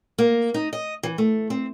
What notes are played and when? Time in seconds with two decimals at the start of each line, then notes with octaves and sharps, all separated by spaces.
0.18 A#3
0.54 D#4
0.73 D#5
1.03 E3
1.18 A3
1.50 C4